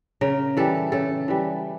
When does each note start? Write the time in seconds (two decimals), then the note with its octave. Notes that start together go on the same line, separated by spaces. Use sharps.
0.21 C#3 A#4
0.57 E3 G3 A4
0.92 C#3 A4
1.28 E3 G3